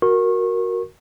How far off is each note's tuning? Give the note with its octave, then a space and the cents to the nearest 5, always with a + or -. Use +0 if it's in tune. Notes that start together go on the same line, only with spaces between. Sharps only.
F#4 +0 A#4 +0 C#6 -30